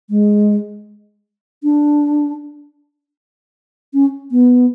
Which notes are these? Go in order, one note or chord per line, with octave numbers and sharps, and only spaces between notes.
G#3
D4
C#4
B3